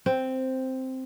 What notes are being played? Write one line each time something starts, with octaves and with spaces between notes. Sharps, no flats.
C4